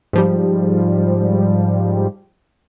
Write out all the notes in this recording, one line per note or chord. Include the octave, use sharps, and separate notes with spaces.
G#2 F3 G3